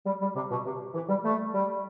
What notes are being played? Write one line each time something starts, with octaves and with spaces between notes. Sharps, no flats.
G3
G3
C3
B2
C3
E3
G3
A3
G3